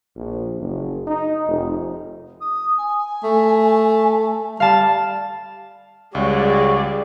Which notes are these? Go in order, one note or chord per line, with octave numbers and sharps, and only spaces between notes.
A#1
F#1
D#4
F1
D#6
G#5
A3
G3 D5 F5 A5
C#2 G3 F#4 G#4 C#5 D5